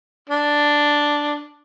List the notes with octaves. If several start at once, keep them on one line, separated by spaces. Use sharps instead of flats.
D4